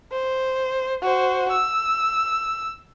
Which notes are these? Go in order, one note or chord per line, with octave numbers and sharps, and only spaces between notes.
C5
F#4 C5
E6